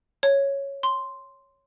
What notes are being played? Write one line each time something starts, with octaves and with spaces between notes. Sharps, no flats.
C#5
C6